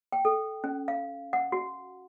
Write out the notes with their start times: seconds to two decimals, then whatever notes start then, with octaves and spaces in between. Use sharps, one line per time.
0.12 G5
0.25 A4
0.64 C#4
0.88 F5
1.33 F#5
1.52 F#4